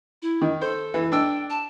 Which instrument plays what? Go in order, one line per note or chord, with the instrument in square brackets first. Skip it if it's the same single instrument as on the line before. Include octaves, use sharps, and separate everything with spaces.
[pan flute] E4
[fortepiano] D#3
[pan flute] A4 [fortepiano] C5
[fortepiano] E3
[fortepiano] D4 E6 [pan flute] G5
[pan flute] A5